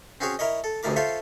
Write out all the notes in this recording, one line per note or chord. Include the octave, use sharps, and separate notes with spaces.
C4 C#4 F#4 G#4 C#5
E4 A#4 C#5 D#5
A4
A1 D2 A2 A3 A#4 D6
F4 A4 C5 C#5 E5